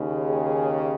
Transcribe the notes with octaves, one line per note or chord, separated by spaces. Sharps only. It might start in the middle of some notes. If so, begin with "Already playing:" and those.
Already playing: D#2 C#3
G#4